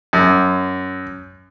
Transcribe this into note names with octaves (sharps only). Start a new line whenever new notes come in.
F#2